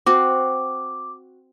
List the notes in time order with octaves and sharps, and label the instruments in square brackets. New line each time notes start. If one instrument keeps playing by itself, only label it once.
[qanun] C4 F#4 [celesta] D6